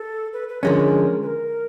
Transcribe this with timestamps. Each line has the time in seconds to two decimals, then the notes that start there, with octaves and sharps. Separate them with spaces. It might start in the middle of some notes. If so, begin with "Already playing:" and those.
Already playing: A4
0.33 B4
0.48 B4
0.63 D3 F3 G#3 C#4 A#4
1.22 B4
1.26 A#4